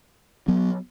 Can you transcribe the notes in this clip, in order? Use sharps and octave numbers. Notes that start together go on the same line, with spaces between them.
F#3 B3